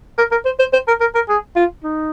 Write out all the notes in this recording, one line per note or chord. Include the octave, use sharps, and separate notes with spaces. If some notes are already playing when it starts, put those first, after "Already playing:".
A#4
A#4
C5
C5
C5
A#4
A#4
A#4
G#4
F4
D#4